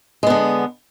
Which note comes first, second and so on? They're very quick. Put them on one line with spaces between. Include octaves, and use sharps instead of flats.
G#3 B3 D3